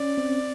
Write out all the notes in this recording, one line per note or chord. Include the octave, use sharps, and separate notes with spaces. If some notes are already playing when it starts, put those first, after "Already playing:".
Already playing: C#4 D5
C4